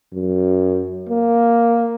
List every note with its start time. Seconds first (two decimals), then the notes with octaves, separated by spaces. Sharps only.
0.13 F#2
1.09 A#3